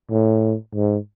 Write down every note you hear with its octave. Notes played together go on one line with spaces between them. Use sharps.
A2
G#2